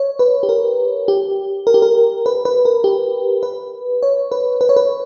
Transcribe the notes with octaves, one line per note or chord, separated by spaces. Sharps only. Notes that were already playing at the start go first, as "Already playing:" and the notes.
Already playing: C#5
B4
G4
A#4
G4
A#4
G4
A#4
B4
B4
A#4
G4
B4
C#5
B4
B4
C#5
B4